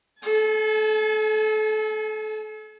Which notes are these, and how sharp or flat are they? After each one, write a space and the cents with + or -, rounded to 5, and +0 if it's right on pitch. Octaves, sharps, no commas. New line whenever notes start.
A4 -30 G#5 +40